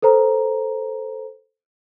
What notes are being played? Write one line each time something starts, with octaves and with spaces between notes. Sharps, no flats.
A4 B4 C5 A#5